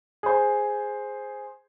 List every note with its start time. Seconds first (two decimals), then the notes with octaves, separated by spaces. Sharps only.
0.23 G#4 C5